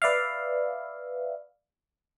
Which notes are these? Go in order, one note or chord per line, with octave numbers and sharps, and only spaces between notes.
B4 D5 E5 F5